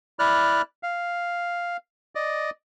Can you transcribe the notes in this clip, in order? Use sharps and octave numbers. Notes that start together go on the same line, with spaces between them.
E4 D5 F6 F#6
F5
D5 D#5